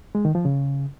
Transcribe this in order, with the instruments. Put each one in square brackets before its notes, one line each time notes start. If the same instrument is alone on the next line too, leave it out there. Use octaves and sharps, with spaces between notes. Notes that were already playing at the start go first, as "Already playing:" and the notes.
[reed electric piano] G#3
D#3
F3
C#3